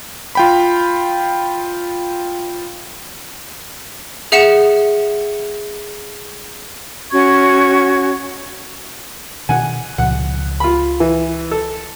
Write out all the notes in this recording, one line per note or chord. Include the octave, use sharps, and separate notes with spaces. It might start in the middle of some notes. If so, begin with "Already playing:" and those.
F4 G5 B5
G#4 E5 F#5 C#7 E7
C#4 F#4 C#6 G#6
B2 D#3 D4 F#5 G#5
C#2 A#2 F3 F#5
F4 B5
E3
A4